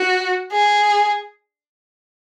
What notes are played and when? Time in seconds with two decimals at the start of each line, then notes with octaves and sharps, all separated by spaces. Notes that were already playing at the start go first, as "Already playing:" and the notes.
Already playing: F#4
0.52 G#4